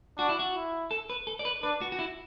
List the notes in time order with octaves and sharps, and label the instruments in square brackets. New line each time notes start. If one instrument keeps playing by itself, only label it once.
[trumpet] D4 [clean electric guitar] F#4
[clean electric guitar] E4
F#4
[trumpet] E4
[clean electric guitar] A4
B4
A4
D5
B4
[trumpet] D4 [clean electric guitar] B4
[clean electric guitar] F#4
F#4
E4